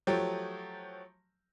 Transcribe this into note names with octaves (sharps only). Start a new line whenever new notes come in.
F3 F#3 A3 G4